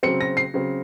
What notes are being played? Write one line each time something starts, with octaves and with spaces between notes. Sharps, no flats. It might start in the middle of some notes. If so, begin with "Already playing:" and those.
C#3 F#3 C4 C#7
A#6
C7
C#3 F#3 C4